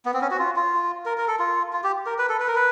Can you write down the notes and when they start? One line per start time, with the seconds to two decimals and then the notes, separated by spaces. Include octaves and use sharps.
0.06 B3
0.14 C4
0.21 C#4
0.31 F#4
0.39 F4
0.56 F4
1.06 A#4
1.18 A#4
1.28 A4
1.39 F4
1.73 F4
1.84 G4
2.06 A#4
2.19 B4
2.29 A4
2.40 B4
2.48 A#4
2.56 B4